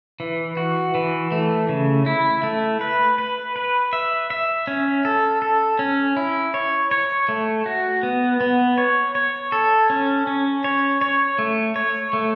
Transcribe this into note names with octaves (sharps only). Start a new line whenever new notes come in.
E3
F#4
E3
A3
C#3
E4
A3
B4
B4
B4
E5
E5
C#4
A4
A4
C#4
E4
C#5
C#5
A3
F#4
B3
B3
C#5
C#5
A4
C#4
C#4
C#5
C#5
A3
C#5
A3